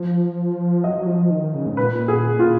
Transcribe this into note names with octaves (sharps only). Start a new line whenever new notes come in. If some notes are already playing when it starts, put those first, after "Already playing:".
Already playing: F3
F#3 D#5
F#3
F3
D#3
C#3
G#2
A#2 B4
G#4
F4